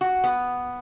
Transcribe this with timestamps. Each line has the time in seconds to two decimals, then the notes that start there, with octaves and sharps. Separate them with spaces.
0.01 F#4
0.24 B3